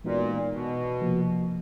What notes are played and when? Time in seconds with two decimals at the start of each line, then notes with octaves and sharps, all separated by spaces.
0.04 A#2 E3 G#3 B3 D#4 F#4
0.52 B2
1.01 C3 F3 A#3